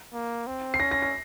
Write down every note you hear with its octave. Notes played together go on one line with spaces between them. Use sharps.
A#3
C4
C7
C#4 A#6
A#6
A#6